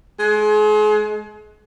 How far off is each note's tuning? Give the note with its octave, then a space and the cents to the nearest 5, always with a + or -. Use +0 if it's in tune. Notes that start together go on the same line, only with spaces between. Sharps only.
G#3 +35